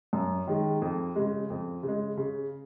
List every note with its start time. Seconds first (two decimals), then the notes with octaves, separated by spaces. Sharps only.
0.13 F#2
0.47 D#3 G#3
0.82 F2
1.16 C#3 G#3
1.50 F2
1.83 C#3
1.88 G#3
2.17 C#3